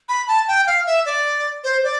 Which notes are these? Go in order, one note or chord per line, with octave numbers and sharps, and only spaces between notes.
B5
A5
G5
F5
E5
D5
C5
D5